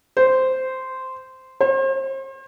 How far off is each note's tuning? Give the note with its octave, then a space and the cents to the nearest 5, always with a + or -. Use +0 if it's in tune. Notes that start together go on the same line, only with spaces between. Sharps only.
C5 -10
C5 +40